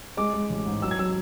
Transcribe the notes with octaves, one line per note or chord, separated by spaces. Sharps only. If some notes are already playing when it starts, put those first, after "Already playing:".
G#3 D6
G#3
A1
G#2
F#3 E6
G#6
F#3 E6